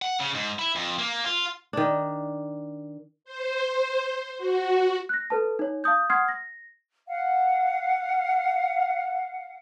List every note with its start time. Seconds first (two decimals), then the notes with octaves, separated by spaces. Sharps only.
0.02 F#5
0.20 C#3
0.35 G#2
0.59 E4
0.76 F2
0.99 A#3
1.25 F4
1.73 D#3 D4
3.25 C5
4.38 F#4
5.09 F#6 A#6
5.30 A4 B4 A5
5.59 D#4 C#5
5.84 F5 A5 D#6 G6
6.10 F#5 C6 D#6 F6 G#6 C7
6.28 A#6
7.08 F5 F#5